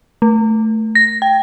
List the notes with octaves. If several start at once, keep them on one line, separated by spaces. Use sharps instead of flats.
A3
A#6
G5